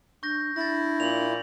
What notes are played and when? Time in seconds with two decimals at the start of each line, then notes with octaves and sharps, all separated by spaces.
0.23 D4 C#6 G6 A#6
0.56 D4 E4 A6 A#6
1.00 A#2 F7 F#7